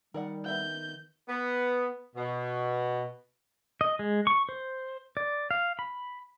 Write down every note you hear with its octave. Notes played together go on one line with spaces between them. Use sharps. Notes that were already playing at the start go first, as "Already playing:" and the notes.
D#3 G3 A#4 D5 F#5
B3 E5 G5 G6
B3
B2
D#5
G#3
C#6
C5
D5
F5
B5